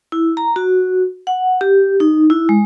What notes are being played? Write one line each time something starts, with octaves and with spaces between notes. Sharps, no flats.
E4
A#5
F#4
F#5
G4
D#4
E4
G#3